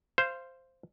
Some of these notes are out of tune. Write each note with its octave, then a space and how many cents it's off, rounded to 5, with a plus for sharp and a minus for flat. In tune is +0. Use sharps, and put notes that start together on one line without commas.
C5 +0 F5 -20